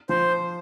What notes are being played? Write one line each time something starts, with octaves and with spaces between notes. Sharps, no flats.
F3 C5